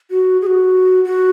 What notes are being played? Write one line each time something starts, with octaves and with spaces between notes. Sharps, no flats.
F#4
G#4
F#4
F#4